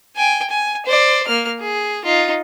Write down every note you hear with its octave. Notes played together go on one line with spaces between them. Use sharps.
G5 G#5
G#5
C5 D5
A#3 F6
G#4
D#4 F4